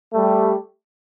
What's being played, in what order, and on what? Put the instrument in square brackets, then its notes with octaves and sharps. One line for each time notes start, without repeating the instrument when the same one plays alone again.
[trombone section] G3 A3